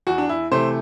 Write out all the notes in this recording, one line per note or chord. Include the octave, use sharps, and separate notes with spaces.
E2 F#4
D4
E4
C3 E3 A3 C5